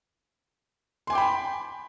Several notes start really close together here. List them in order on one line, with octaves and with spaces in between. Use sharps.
C6 G#5 D6 G5 B5